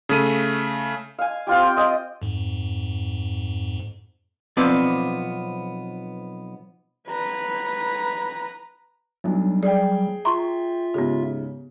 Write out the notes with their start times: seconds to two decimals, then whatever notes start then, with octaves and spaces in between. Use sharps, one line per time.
0.09 C#3 A3 D#7
1.19 F5 G#5
1.47 C4 F4 G4
1.62 G5
1.77 D#5 G5
2.22 F2 G#2
4.57 B1 F3 B3 C4 D5
7.08 B4 A#5
9.24 B1 F#3 G3 D4
9.63 G#4 D5 G5
10.25 F4 E5 A#5 C6 C#6
10.94 G#2 C#3 B3 G4